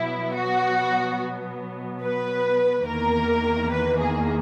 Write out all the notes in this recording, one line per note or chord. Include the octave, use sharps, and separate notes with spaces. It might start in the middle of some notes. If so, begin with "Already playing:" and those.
Already playing: B2 F#3 B3 E4
F#4
B4
E2 D#3 A#3 A#4
B4
G#4